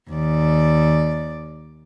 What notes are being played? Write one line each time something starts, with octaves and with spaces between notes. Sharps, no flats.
D#2 D5